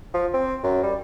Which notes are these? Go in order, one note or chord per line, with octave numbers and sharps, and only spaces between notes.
F3
C4
F#2
G3